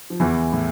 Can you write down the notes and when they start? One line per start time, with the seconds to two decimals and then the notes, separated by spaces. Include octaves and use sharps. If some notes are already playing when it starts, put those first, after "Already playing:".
0.10 F3
0.20 E2 E3
0.53 A2